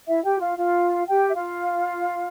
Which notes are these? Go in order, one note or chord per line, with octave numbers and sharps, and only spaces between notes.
E4 E5
G4 G5
F4 F5
F4 F5
G4 G5
E5
F4 F5